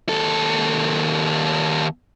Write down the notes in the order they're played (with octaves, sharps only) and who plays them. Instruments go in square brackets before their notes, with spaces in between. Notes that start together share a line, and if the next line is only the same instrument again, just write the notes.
[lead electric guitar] D#2 A4